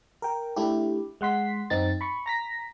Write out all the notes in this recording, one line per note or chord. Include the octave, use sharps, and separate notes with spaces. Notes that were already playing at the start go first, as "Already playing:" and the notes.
A#4 G5
A3 D4 E4 G4
G#3 F#5 C6 B6
F#2 C4 D#4 A6
B5 C#6
A#5 A#6 B6